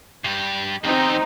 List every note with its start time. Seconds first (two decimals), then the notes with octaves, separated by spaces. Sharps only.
0.24 G2 G4
0.84 E2 C4 D#4 G4